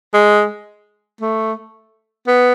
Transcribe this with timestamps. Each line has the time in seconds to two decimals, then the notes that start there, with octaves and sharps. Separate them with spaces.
0.14 G#3
1.21 A3
2.27 B3